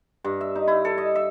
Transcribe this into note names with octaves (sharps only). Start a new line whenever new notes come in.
G2
E5
D#4
E4
A4
D#5
E5